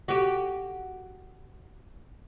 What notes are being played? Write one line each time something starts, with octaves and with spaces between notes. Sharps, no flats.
F#4 G4